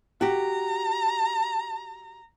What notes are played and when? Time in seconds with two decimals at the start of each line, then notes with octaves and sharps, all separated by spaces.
0.21 F#4 G4 A#5